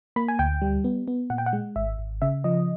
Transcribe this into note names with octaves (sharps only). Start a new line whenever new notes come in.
A#3 B5
G#5
D2 G5
G3
B3
B3
A#2 F#5
G5
F#5
G#3
G#1 E5
G#1
C#3 E5
F3 D#5